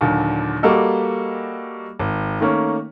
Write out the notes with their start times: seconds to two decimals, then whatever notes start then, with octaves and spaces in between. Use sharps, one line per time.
0.01 D#2 A#2 D3 F#3
0.63 G3 A#3 F#4 G4 A4 D#5
2.00 G#1
2.41 D#3 A3 A#3 C#4